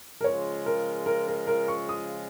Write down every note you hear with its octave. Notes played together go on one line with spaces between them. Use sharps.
A#4
C#3 F3 G#3 F4 C#5
A#4
A#4
A#4
A#4
C#6
D#6